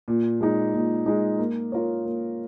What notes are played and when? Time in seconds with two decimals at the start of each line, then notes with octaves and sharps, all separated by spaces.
0.08 A#2
0.41 G#3 D#4
0.74 A#2
1.06 G#3 D#4
1.39 A#3
1.72 F4 A#4 C#5
2.05 A#3